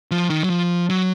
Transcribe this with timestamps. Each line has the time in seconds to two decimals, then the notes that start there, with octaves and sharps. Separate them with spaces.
0.11 F3
0.30 D#3
0.44 F#3
0.50 F3
0.90 F#3